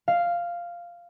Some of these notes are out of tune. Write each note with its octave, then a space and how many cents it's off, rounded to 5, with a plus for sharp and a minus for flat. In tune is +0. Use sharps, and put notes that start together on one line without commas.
F5 -5